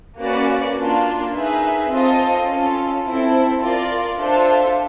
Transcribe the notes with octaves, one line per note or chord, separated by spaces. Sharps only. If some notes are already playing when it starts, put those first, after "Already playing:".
A#3 C#4 F#4 B4 D5
A#3 D4 F4
D#4 G#4 B4 E5
C4 F4 A4 C5 D#5
C#4 F4 A4
C4 E4 A4
F4 A#4 D5
D4 F4 A4 C5 E5